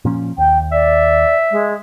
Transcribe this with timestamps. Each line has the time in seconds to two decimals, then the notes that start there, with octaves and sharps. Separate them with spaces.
0.05 A#2 F3 C#4
0.38 D#2 G5
0.72 D5 E5
1.51 G#3